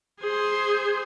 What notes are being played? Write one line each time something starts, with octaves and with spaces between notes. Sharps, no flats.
G#4 C5